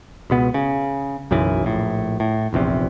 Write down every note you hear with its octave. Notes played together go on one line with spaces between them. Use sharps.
C#2 B2 B3
C#3
B1 F#2 C#3 E3
A#1 A2
A2
F1 A#1 E2 C3